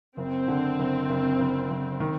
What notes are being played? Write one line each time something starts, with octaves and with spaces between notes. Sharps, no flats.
F#1 C4
D3
F#1
F#1
F#1
F#1
D#3